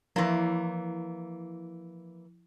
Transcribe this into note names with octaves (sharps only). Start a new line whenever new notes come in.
E3 F3 A#3 E4